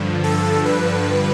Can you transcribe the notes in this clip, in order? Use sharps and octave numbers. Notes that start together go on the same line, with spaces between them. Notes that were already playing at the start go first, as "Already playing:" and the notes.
Already playing: G2 D3 F3
A4
B4